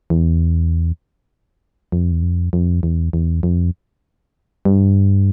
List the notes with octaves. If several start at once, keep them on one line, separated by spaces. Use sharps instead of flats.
E2
F2
E2
F2
F2
E2
E2
F2
G2